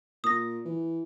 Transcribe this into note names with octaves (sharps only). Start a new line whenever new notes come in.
A#2 D#6 A#6
E3